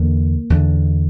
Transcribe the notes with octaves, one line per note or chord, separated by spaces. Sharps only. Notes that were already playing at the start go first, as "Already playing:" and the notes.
Already playing: E2 D3 A#3
E2 D3